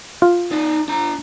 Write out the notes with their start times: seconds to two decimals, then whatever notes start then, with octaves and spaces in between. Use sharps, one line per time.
0.22 F4
0.52 D#4 D5
0.88 D4 A#5